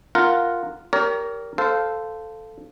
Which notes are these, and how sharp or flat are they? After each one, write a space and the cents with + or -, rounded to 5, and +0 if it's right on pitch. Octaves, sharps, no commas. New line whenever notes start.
F4 -5 A#4 +0 F#5 +0
G4 +0 A#4 +0 C#5 +40
A4 +0 C5 -20 F5 +0